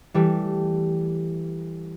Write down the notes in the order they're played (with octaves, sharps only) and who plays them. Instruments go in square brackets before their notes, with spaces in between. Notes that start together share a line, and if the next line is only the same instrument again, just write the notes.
[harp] E3 G3 A3